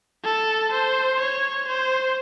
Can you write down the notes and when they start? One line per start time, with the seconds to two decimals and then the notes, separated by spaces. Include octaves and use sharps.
0.24 A4
0.72 C5
1.19 C#5
1.67 C5